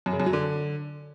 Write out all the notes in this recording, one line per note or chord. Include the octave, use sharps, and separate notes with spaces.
F#2
C#3
F#2
F#3
D3